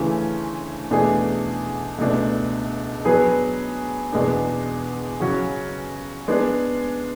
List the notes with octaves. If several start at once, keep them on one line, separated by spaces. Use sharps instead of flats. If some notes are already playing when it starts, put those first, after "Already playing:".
Already playing: D2 C#3 E3 A3 C#4
E2 B2 A3 D4 G#4
C#2 B2 A3 D4
F#3 B3 D4 G#4 B4
E2 B2 G#3 B3 D4
C#3 F#3 C#4 F#4
G#3 B3 D4